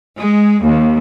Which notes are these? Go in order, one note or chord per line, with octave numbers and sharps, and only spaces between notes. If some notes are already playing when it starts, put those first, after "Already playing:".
G#3
D#2